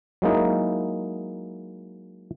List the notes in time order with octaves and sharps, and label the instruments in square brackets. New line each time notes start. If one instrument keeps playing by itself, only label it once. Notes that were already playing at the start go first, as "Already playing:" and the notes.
[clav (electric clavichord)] F#3 G#3 A#3 D#4 E4